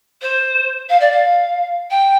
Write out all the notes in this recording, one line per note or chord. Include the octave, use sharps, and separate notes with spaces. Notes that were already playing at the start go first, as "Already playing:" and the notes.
C5
F5
D5
F5
G5